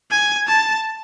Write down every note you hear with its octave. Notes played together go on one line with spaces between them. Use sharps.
G#5
A5